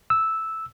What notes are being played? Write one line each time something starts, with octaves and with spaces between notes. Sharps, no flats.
E6